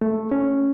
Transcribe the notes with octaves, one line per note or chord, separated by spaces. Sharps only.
A3
C#4